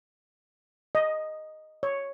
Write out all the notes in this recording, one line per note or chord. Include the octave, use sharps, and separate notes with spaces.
D#5
C#5